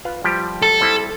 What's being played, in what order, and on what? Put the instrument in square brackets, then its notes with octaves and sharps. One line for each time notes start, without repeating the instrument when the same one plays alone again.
[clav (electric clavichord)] F4 B4 F5
F3 G3 G4
[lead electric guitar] A4
[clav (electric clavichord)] G3 C4 E4